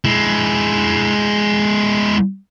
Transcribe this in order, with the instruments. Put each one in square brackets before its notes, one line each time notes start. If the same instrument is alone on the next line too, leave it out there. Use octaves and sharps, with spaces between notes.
[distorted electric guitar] G#3 E4